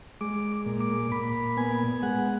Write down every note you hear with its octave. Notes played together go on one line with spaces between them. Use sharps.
G#3 D6
A#2
D6
A#2 B5
B3 G#5
G#3 F#5